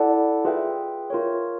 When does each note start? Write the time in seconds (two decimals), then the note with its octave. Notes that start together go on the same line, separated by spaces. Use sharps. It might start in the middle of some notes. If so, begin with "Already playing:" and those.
Already playing: E4 A4 D5 F#5 A5
0.45 F4 G#4 B4 E5 G5
1.10 F4 A#4 C#5